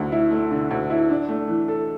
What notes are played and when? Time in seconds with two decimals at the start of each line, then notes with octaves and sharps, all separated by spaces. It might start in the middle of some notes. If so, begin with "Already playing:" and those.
Already playing: D2 D3 A3
0.12 E4
0.31 A3
0.51 D3
0.71 D2
0.90 E4
1.10 D4
1.29 A3
1.48 E3
1.68 A4